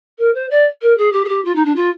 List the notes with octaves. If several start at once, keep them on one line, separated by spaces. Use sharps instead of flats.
A#4
C5
D5
A#4
G#4
G4
G#4
G4
F4
D#4
D4
F4